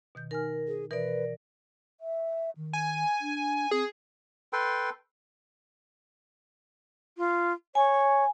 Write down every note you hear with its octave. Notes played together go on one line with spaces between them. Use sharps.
B2 D#3 G6
D#4 A#4 G#5 F6
G#4
B2 E3 A#4 B4 D5
E5
D#3
G#5
D4
C4 G#4
A4 B4 G5 C6
F4
C#5 G#5